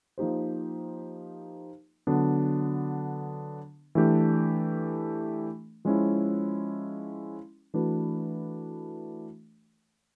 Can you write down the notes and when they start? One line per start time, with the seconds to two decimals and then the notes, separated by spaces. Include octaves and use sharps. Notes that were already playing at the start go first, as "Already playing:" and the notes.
0.18 F3 A#3 D#4 G4 C5
2.07 D3 F#3 B3 D4
3.95 E3 A3 D4 G4
5.85 F3 G#3 C#4 E4
7.74 E3 A3 D4 F#4 B4